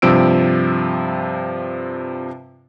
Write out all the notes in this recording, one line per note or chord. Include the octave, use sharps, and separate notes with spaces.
G2 C3 F3 E6 D7